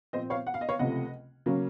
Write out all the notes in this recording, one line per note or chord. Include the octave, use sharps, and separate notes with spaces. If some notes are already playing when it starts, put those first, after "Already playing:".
A#2 F3 C4 C5 D#5
C#5 F5
F#5
F5
D#5
C#5 F5
C#2 C3 F3 A3 D#5 F#5
C#3 F#3 A#3 C#4